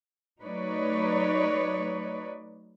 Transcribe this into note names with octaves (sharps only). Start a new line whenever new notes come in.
F#3 A3 D#4 B4 C#5 D5